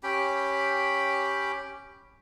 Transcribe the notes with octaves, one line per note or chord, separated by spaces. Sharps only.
C#4 G4 G5 B5